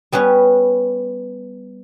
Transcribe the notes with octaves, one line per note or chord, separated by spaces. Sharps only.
G3 B3 C#4 B4